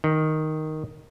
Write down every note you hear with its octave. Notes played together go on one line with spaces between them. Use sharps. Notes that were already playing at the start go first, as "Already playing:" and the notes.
D#3